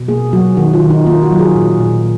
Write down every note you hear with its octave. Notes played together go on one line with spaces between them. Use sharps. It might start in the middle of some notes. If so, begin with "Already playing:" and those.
Already playing: B2
A#3 G#4
F#3 F#4
D#3 F#4
F4
D#3
D#4
A#3 F4
F#4
F#3
G#4
A#2
A#2